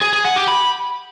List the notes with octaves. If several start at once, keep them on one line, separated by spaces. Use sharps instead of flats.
G#4
G#4
F#5
G4
B5